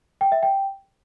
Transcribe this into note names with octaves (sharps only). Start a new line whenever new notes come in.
G5
E5
G5